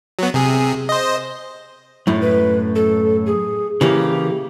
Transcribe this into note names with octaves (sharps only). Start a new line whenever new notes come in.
F#3 B3
C3 G#4
C5 D#5
F#2 A2 E4
B4
A4
G#4
C#3 E3 A#3 G4